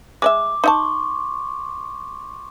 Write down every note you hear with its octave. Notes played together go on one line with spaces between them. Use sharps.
G#3 D5 E5 D6
D#4 E5 A5 C6 C#6